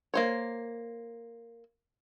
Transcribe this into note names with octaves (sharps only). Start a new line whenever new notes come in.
A#3 C5 C#5